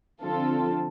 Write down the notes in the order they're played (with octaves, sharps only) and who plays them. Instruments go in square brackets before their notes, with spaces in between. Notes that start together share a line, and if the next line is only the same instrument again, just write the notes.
[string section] D3 F3 C4 F4 A4